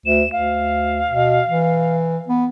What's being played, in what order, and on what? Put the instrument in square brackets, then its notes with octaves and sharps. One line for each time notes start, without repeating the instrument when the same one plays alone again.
[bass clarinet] D2 [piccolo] E7
[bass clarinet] D2 [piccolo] F5
[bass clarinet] B2
E3
B3